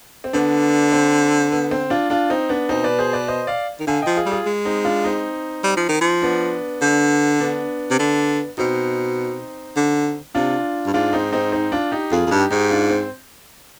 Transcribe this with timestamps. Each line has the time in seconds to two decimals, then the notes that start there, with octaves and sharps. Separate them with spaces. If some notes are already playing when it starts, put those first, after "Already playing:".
0.24 C4
0.33 D3 B3 D4
0.92 C4
1.52 B3
1.71 C4
1.90 D4 F4
2.10 D4 F4
2.30 C4 D#4
2.49 B3 D4
2.69 B2 C4 D#4
2.84 B4 D5
2.99 G#4 C5
3.13 B4 D5
3.28 C5 D#5
3.47 D5 F5
3.80 D#3
3.87 D3 F5 G#5
4.02 F3 D#5 G5
4.17 F4 G#4
4.26 G3
4.31 F4 G#4
4.46 G#3
4.65 C4 D#4
4.85 D4 F4
5.04 C4 D#4
5.64 G3
5.77 F3
5.89 D#3
6.01 F3
6.22 B3 D4
6.82 D3
7.40 B3 D4
7.91 C3
7.99 D3
8.58 B2 C4 D#4
9.76 D3
10.35 C3 D4 F4
10.86 G2
10.93 G#2 D4 F4
11.13 C4 D#4
11.32 C4 D#4
11.52 C4 D#4
11.72 D4 F4
11.91 D#4 G4
12.12 F2 F4 G#4
12.27 F2
12.31 G2 D#4 G4
12.50 G#2 D#4 G4
12.71 D4 F4
12.90 C4